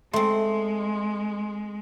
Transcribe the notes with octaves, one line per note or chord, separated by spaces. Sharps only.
G#3 A3 C4 C6